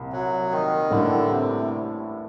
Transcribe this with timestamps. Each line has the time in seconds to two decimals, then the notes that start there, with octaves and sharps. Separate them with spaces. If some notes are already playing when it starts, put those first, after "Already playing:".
Already playing: C2 A#2
0.13 F#3
0.52 D#3
0.90 A1 A2 D3 G3 A#3 D4
1.29 C3